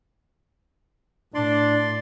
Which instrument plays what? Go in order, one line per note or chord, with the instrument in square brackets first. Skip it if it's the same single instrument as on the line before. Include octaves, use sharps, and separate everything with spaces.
[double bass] A2 [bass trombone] D4 [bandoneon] D5 C6